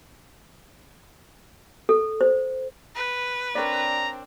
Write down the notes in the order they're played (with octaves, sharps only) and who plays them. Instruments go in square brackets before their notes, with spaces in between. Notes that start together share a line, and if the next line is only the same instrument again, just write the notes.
[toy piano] A4
C5
[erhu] B4
[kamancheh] C4 D4 [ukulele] A#4 C#5 D5 [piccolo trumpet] A#5